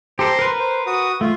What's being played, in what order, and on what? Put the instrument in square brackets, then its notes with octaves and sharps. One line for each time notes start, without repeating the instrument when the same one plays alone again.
[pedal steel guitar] G4 A4 [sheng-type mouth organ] C5 A#5 C6
[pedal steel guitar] A#4 B4
[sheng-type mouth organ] C5
F#4 D#6
[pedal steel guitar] A3 [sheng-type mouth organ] F4